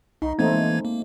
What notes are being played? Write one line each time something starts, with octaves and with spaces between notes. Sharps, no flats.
C2 D#4
E3 A3 A#3 C4 D#4 G#6
G#3
A#3